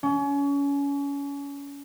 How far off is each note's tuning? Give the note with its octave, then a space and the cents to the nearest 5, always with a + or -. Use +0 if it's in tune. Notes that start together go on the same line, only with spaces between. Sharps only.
C#4 +30